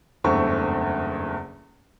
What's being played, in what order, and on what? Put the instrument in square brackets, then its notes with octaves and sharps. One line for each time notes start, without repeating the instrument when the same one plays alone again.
[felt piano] F#1 E2 G2 A3 C4 C#6